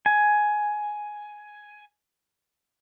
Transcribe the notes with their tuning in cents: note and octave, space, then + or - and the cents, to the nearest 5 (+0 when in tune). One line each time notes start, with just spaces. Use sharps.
G#5 +10